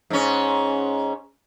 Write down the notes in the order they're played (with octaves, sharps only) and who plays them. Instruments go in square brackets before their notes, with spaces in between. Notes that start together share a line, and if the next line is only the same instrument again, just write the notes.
[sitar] G#2 C#4